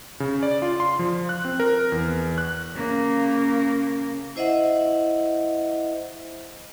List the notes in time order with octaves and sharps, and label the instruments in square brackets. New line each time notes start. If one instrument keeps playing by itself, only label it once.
[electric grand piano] C#3
D5
F4
C6
F3
F#6
C4
A#4
E2
F#6
[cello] C#3 A#3
[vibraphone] E4 C5 D#5 E5 F#5